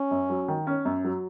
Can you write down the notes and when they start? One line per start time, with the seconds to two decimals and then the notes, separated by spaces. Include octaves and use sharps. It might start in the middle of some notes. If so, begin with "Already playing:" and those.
Already playing: C#4
0.11 F#2
0.30 F#3
0.48 D#3
0.67 C#4
0.85 F#2
1.04 F#3